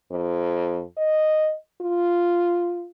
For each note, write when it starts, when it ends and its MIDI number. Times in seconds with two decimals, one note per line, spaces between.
0.11 0.82 41
0.97 1.53 75
1.81 2.88 65